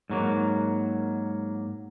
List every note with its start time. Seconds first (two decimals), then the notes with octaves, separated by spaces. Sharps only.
0.10 G#2 F#3 A#3